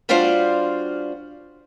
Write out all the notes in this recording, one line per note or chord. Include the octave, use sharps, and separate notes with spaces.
G3 D4 F4 F#4 C5 F5